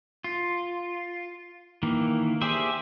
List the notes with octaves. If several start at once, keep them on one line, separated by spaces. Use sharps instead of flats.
F4
D#3 E3 A#3
G4 G#4 C5 D5 E5